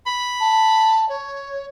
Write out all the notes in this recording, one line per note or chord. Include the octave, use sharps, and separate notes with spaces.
B5
A5
C#5